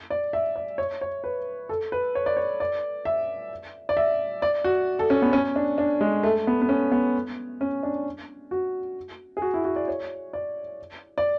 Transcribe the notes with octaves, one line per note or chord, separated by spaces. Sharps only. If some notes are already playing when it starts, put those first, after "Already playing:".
D5
E5
D5
C#5
C#5
B4
A4
B4
C#5
D5
C#5
D5
E5
D5
E5
D5
F#4
A4
C#4
B3
C#4
D4
D4
G#3
A3
B3
B3
C#4
B3
C#4
D4
F#4
G#4
F#4
E4
F#4
D5
C#5
D5
D5